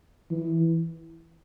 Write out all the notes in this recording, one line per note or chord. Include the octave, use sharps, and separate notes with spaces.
E3